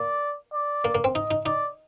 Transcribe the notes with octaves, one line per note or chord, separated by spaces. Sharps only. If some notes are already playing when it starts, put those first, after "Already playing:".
Already playing: A#3 D5
D5
A#3
A#3
C4
D#4 D#5
D#4
D#4 D5